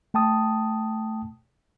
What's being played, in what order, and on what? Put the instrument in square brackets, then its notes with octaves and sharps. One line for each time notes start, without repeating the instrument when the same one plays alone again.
[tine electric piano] A3 G5 A5 D#6